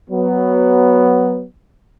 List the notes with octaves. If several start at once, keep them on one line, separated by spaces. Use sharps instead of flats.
F#3 B3